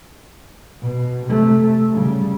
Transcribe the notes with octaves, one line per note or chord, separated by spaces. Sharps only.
B2
C3 A3
C#3 G3